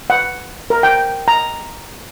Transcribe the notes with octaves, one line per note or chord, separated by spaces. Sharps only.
F#5
A#4
G5
A#5